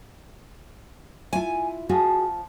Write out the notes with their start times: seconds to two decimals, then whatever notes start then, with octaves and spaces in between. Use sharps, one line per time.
1.33 E4 F4 G#5
1.89 F3 F#4 G#4